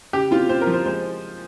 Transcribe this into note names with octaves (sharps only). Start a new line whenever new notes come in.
C#3 G4
C4 F4
C4 C5
A#4
F3
C5
G#3 C5